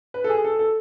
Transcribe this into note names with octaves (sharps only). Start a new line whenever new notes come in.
B4
A4
G#4
A4
A4